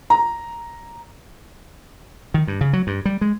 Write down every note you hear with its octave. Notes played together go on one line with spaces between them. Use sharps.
A#5
D#3
G2
C#3
F#3
G2
G3
G#3